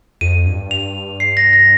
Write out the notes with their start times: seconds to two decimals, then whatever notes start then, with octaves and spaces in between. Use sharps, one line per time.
0.21 F2 D#7
0.47 G2
0.71 F7
1.20 C7
1.37 A#6
1.53 A#6